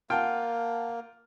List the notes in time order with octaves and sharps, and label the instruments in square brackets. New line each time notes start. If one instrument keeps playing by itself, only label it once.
[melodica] A#3 [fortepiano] F4 G5 [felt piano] F#5 A5 F6